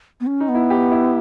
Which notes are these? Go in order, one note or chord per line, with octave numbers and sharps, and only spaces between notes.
B3
C#4
D#4
B3
E4
G4
E4